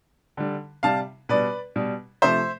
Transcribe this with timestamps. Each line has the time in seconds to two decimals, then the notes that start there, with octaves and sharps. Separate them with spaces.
0.37 D3 G3
0.83 C3 G3 F5 A5
1.29 B2 G3 B4 D5
1.76 B2 G3
2.22 C3 F3 A3 C5 E5